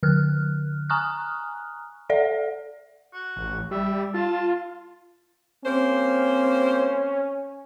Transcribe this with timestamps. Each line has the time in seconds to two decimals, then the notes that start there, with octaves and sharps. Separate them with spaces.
0.03 D3 F6 F#6
0.90 G#5 A#5 C#6 D#6 F6 F#6
2.09 A4 D5 E5 F#5
3.13 F#4
3.37 A1
3.71 G3 E5
4.14 F4 A5
5.65 G3 A#3 C4 C#4 C5